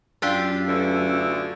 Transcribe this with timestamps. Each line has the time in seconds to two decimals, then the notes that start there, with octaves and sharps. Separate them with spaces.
0.22 F#2 D4 F4 G4 E6
0.67 D2 D3 E3